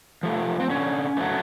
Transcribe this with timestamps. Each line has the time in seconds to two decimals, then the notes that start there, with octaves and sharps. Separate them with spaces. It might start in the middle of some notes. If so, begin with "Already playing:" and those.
0.23 F3 A3
0.60 C4
0.70 D3 C#4
1.17 F#3 A3